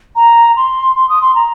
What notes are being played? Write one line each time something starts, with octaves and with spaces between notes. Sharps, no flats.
A#5
C6
C6
D#6
C6
A#5